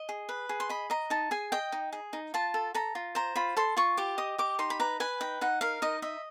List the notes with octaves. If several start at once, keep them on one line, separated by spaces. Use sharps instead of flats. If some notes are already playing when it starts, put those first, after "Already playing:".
Already playing: D#5
G#4
B4
G#4
C6
D#5 B5
D#5 A#5
D#4 A5
G#4 G#5
D#5 G5
D#4
G#4
D#4
F4 A5
A4
A4 A#5
F4
C5 A#5
F4 B5
A4 C6
F4 C#6
G4 D6
D#5 D#6
G4 D6
D#4 C6
B5
B4 A#5
B4 G#5
D#4 G5
D#4 F#5
A#4 F5
D#4 D#5
D#5 E5